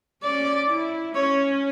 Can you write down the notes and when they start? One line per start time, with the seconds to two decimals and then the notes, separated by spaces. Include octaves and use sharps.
0.23 C#4 D5
0.69 E4
1.15 C#4 C#5